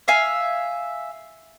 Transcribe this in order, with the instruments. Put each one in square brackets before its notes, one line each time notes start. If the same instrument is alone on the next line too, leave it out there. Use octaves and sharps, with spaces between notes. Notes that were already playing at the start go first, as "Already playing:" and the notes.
[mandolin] E5 F5 G#5